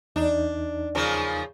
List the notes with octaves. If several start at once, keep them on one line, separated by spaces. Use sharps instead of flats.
E2 D4 D#4
C#3 F3 A#3